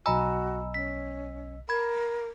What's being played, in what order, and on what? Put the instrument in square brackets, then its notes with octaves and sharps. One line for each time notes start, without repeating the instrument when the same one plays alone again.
[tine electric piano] B1 D#5 E6 [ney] F#4 [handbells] G#5 A#5 B5
[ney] C#4 [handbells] B6
[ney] A#4 [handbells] B5 G#6